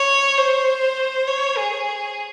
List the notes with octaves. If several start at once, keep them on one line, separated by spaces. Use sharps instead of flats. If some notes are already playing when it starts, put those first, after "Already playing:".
Already playing: C#5
C5
C#5
G#4